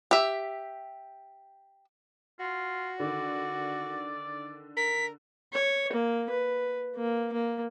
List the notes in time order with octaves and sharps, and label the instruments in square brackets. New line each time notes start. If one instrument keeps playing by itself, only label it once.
[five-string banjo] G4 E5
[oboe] F4 [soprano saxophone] F#4
[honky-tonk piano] D3 D#3 [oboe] D5
[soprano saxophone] A#4 [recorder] B6
[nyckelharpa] C#5
A#3
B4
A#3
A#3